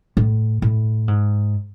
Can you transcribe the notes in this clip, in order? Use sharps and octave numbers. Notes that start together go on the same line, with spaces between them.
A2
A2
G#2